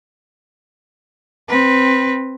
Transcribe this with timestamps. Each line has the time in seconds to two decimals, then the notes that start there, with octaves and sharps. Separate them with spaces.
1.49 C4 B4